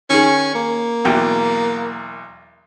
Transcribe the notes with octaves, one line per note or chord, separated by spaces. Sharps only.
D#3 C#4 G#4
A#3
B1 E2 G5